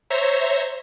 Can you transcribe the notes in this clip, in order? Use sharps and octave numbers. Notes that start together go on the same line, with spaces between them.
C5 C#5 E5 A#5